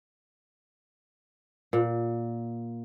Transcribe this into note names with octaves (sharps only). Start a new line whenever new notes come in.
A#2